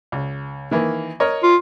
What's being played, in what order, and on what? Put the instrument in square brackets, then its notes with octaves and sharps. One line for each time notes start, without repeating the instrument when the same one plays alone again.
[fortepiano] C#2
D#3 E3 A#3
A#4 C#5 D#5
[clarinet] F4